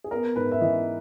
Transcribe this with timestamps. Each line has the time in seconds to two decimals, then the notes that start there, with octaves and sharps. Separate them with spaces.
0.04 G#4
0.11 B3 A#4
0.36 G#2 B4
0.51 E5
0.61 E3 D#5